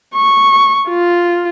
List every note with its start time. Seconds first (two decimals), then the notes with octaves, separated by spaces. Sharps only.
0.15 C#6
0.88 F4